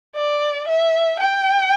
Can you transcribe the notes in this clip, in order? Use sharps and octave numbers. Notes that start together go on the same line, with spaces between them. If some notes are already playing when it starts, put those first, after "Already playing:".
D5
E5
G5